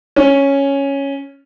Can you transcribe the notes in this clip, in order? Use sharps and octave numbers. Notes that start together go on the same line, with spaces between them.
C#4